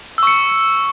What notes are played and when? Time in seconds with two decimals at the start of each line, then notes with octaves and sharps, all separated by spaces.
0.18 E6
0.23 C#6
0.27 C#7